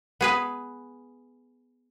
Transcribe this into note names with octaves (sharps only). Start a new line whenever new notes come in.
B3 G#4 B4